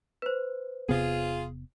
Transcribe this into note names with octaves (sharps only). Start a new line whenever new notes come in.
B4 C5
E1 C3 B3 F4 G#4